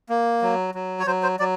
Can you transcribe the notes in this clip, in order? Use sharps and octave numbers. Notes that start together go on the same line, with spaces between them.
A#3
F#3
F#3
C#5
F#3 C5
C5
F#3 D5